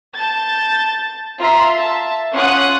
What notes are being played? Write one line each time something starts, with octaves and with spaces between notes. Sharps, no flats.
A5 G6 A6
F4 E5 A#5 C6
E5 A5
C#4 F4 F#5 C6 D#6 F#6